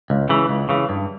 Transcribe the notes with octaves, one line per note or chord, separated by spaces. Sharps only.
C#2
C#3 E3
C#2
C#3 E3
G2